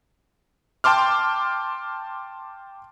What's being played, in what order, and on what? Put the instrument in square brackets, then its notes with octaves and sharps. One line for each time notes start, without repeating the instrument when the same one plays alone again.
[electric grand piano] G5 A5 C6 D6 F6